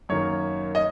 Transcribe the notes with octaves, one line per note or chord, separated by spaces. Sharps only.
F#2 D#3 A#3 C#5
D#5